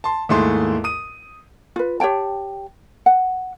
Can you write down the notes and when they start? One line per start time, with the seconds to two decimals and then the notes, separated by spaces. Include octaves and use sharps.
0.04 A5 C6
0.29 D#2 G#2 A3 E4 G#4 C6
0.84 D#6 D#7
1.76 F4 B4
2.00 G4 C#5 G5 A5
3.06 F#5